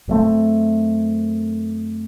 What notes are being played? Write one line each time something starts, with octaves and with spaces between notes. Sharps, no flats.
F#2 F#3 A3 C4